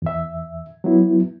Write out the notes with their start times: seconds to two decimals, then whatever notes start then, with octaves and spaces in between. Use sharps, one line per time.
0.02 E2 E5
0.84 F#3 B3 E4